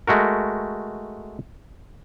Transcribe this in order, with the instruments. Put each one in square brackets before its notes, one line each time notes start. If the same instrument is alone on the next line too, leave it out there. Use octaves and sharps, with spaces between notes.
[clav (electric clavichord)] G#3 A3 F#4 A#4